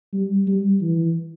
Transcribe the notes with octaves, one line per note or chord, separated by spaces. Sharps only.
G3
G3
E3